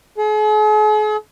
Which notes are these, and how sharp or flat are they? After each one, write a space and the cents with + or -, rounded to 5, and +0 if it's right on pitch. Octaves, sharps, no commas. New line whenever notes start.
G#4 +45